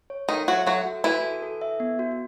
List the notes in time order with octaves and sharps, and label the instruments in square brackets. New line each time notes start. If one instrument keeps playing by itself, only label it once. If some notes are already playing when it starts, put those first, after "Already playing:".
[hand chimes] C#5
[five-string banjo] D#3 D#4 [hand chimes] A4
[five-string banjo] F#3 F#4 [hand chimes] E5
[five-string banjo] F#3 F#4 [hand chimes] A4
[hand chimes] F#4
[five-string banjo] E3 E4 [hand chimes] F#4
[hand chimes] A4
A4
E5
B3
F#4